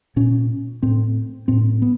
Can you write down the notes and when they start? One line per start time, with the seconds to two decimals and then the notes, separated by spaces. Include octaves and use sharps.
0.16 A#2 C#4
0.83 A2 C4
1.48 A2 C4
1.82 B3